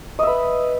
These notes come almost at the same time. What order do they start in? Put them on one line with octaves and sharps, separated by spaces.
D#5 E5 B4